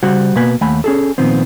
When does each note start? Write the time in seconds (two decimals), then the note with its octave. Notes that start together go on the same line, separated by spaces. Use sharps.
0.03 C#3 G3 F#4 C5 F#5
0.35 B2 A#3 B4 G#5
0.61 D#2 A3 F#5 G#5 B5
0.84 C#4 G#4 A4
1.18 A#2 D#3 F3 B3 C4